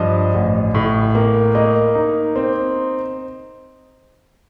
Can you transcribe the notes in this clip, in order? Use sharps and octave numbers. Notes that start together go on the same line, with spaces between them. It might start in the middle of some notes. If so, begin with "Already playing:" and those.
Already playing: G2 F3 D#5
A1
A2
A#3
A#3 D#5
D#4
C4